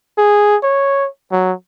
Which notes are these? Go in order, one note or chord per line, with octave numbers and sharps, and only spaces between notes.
G#4
C#5
F#3